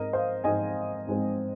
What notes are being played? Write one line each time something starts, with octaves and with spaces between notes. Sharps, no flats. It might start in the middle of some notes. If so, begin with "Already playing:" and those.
Already playing: G#2 G#3 C4 A#4 D#5
C5 F5
G#2 G#3 C4 D#5 G#5
G#2 G#3 C4